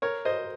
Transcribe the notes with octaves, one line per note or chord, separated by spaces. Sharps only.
A#4 C#5
C5 D#5